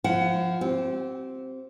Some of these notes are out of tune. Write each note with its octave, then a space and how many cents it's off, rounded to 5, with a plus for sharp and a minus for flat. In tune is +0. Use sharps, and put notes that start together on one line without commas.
F3 +5 E4 +40 F#5 +20
C4 +0 G4 -30